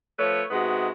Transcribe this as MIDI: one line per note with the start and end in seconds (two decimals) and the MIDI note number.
0.19 0.43 53
0.19 0.43 57
0.19 0.43 71
0.19 0.43 73
0.50 0.89 48
0.50 0.89 56
0.50 0.89 59
0.50 0.89 63
0.50 0.89 66